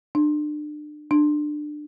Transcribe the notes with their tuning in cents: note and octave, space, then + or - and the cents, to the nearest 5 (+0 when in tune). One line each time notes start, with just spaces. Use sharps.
D4 +35
D4 +25